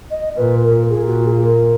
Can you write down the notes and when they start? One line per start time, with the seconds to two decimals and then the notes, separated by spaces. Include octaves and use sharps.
0.11 D#5
0.37 A#2 B4
0.64 A#4
0.90 A#2 G#4
1.07 F#4
1.25 G#4
1.43 A#4